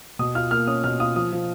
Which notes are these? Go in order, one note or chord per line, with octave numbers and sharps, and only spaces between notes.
B2 D#6
F4 F6
A#3 F6
C#4 D#6
B2 F6
F4 D#6
F3 D#6
F3